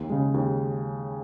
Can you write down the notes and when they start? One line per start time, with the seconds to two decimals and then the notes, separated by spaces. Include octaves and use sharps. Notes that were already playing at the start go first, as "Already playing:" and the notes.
Already playing: D#2
0.10 C#3 G#3
0.34 D#2